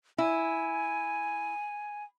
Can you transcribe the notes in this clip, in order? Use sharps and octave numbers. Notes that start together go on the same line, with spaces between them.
E4 G#5